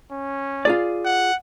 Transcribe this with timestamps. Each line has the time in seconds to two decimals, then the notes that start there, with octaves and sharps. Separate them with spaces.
0.12 C#4
0.65 F4 G#4 D5
1.05 F#5